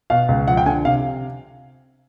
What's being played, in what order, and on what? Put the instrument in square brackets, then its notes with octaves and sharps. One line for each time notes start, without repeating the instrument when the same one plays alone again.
[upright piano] B2 [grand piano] F5
[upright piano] C#2
[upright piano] F3 [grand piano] F#5
[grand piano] G5
[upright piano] D3 [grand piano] G#5
[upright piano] C3 [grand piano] F5